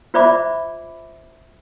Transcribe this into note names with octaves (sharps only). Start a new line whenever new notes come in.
F4 C5 D5 E5 B5 D6